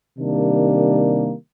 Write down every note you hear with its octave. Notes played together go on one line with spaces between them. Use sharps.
C3 D#3 G3 A#3 D4